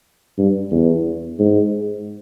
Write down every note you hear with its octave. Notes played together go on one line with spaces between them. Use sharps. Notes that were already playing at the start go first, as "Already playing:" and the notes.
G2
E2
G#2